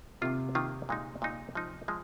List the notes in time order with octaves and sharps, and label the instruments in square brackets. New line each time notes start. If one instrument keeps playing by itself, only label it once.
[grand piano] C3 [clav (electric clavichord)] D#3 A#3 F4
[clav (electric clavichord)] D#3 A#3 F4
A#2 G#3 D#4
A#2 G#3 D#4
F3 G#3 D#4
F3 G#3